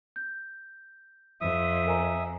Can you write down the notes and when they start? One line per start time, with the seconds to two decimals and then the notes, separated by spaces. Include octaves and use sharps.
0.16 G6
1.41 F2 E5 D#6
1.87 A#4 G#5 A#5